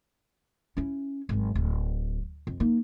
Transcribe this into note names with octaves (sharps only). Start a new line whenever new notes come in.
C#4 E4
G#1 F#3
D1
F2
A#3 D#4